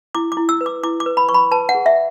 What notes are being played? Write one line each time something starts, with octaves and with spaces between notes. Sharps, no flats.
E4 D6
D6
E4
E6
B4
D6
E4 D6
D6
B4
B5
B4 C#6
B5
B4 A5
F#5
G#4
E5